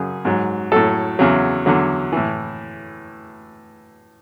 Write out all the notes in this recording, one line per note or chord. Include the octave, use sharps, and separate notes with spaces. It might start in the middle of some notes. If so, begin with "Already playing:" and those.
Already playing: F#2 C#3 F#3 G#4
G#2 F#3
A2 F#3 A4
E2 C#3 F#3
E2 D3 F#3
A2 E3